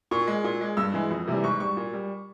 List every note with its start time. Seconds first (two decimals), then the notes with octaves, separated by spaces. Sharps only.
0.11 A#2 C#6
0.27 G#3
0.44 A#2
0.61 G#3
0.77 G2 E6
0.94 E3 G#3
1.11 F2
1.27 C3 E3 G3
1.44 G#2 C#6
1.60 G3 C#6
1.77 A#2
1.93 G3